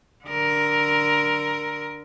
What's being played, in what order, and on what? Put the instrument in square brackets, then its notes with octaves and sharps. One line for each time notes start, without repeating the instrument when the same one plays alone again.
[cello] D3 A#4